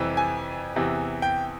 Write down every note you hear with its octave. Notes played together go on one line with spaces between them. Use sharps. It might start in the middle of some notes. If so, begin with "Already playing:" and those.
Already playing: F2 C3 E3 G3
G#5
E2 C3 E3
G5